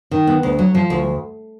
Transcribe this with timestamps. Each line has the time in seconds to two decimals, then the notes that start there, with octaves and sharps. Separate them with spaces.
0.11 D#3
0.27 B3
0.43 D2
0.59 F#3
0.75 F3
0.90 D2